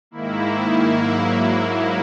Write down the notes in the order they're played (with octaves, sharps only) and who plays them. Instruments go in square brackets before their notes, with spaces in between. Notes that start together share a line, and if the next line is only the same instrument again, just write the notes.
[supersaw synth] G#2 D#3 A#3 E4
G#2 F#3 A#3